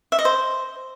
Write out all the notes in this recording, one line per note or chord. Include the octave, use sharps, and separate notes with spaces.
E5
D#5
C5